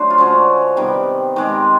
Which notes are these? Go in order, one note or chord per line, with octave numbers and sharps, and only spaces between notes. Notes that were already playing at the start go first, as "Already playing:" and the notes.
Already playing: F#3 A3 D4 C5
F4
D3 F3 G#3 C#4 F#4
C3 D#3 G3 B3
D#3 G#3 C4 G4